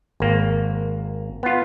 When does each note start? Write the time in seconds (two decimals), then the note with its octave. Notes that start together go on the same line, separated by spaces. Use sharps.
0.20 G#1 A#3
1.43 B3 F4